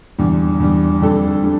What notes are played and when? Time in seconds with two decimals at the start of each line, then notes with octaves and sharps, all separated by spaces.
0.18 E2 D3 G3
0.60 E2 D3 G3
1.01 F2 D3 G3 D4 A4
1.43 D3 G3